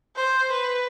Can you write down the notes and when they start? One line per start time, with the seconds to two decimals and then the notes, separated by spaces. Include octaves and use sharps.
0.16 C5
0.52 B4